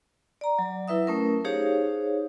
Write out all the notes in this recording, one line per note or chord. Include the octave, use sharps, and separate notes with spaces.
D5 A#5
F#3
F#3 E4 B4 E5 D#6
A3 C#4 A#4
D#4 G4 G#4 C5 C#5 F5